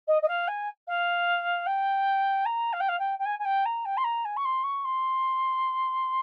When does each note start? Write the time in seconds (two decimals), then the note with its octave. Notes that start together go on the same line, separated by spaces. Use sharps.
0.07 D#5
0.22 D#5
0.28 F5
0.47 G#5
0.87 F5
1.66 G5
2.45 A#5
2.73 F5
2.80 G5
2.88 F5
2.99 G5
3.19 G5
3.25 G#5
3.39 G#5
3.45 G5
3.65 A#5
3.85 G5
3.97 C6
4.04 A#5
4.24 G#5
4.36 C#6
4.45 C6
4.63 C#6
4.84 C6